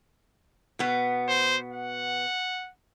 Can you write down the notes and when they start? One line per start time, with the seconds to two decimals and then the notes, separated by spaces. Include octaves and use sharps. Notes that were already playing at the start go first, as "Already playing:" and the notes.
0.79 B2 B3
1.29 C5
1.73 F#5